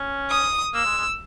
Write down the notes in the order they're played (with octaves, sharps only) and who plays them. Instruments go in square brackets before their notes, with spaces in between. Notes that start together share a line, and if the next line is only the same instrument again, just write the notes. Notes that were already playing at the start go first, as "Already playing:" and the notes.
Already playing: [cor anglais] C#4
[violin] D#6
[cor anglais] A#3 [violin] E6
[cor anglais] G#3
G#3